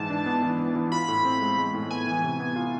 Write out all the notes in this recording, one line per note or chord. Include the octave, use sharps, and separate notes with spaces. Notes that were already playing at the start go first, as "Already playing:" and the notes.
Already playing: G#2 E3 A5
D4
B3
E3
B3
E3
F4 B5
A2
C4
G#3
G#3
A2
B3 G#5
E3
C3
B3
F4